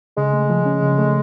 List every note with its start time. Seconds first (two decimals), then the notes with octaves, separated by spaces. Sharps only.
0.17 C#3 G#3
0.33 A3
0.50 F3
0.66 C#4
0.82 C#3
0.98 A3